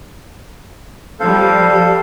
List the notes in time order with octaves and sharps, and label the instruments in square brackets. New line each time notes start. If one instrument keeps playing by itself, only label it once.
[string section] F3 G3 [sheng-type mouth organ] A4 C5 F5